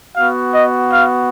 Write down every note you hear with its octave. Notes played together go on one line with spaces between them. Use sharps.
B3 F#4 F5
D#5
F5